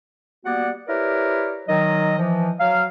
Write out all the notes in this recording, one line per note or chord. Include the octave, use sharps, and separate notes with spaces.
G3 A#3 B3 F#4 D5 F#5
E4 G4 A#4 B4 C#5 D5
D#3 F#3 D#5
E3 F3
F#3 F5